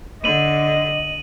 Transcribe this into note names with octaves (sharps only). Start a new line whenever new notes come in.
D3 D#5 D#7 F#7